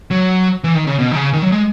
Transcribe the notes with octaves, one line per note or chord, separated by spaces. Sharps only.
F#3
E3
D#3
C#3
B2
D#3
C#3
D#3
F#3
G#3